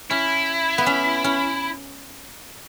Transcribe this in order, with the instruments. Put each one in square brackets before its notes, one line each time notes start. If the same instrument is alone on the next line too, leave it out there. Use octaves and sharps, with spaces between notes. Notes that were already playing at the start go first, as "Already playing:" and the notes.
[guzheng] C#4 [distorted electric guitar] E4
[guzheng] B3
C#4
C#4